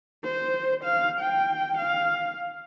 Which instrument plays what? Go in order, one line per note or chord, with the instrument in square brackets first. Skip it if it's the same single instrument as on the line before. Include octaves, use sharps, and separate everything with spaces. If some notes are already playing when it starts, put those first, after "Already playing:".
[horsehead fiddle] C5
F5
G5
F5